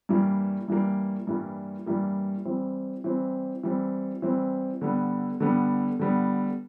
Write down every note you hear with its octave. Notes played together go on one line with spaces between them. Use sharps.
G2 E3 G3 A#3
G2 E3 G3 A#3
G2 E3 G3 A#3
G2 E3 G3 A#3
E3 G3 C4
E3 G3 C4
E3 G3 C4
E3 G3 C4
D3 G3 B3
D3 G3 B3
D3 G3 B3